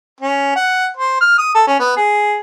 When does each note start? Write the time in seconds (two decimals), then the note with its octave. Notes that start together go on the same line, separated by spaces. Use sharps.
0.21 C#4
0.56 F#5
0.97 C5
1.21 F6
1.38 D#6
1.55 A4
1.67 C#4
1.79 B3
1.97 G#4